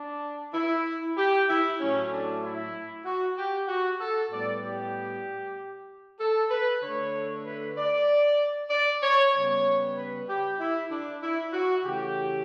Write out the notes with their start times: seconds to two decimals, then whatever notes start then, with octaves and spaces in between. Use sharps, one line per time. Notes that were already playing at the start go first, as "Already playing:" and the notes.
Already playing: D4
0.54 E4
1.17 G4
1.49 E4
1.81 A2 F#3 A3 C#4
2.11 D4
2.43 E4
3.05 F#4
3.38 G4
3.68 F#4
4.00 A4
4.31 A2 G3 B3 D5
4.63 G4
6.20 A4
6.50 B4
6.82 D3 A3 C#5
7.45 B4
7.77 D5
8.70 D5
9.02 C#5
9.33 C#3 G3 B3 C#5
9.97 B4
10.28 G4
10.60 E4
10.90 D4
11.22 E4
11.53 F#4
11.84 C#3 E3 A3 G4